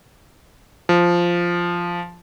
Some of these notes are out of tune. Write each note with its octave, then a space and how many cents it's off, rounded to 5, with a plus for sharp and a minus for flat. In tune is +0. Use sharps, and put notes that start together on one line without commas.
F3 -5